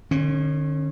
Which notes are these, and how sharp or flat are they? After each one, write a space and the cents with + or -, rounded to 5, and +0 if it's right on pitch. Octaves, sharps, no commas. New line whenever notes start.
D3 +45 C#4 -25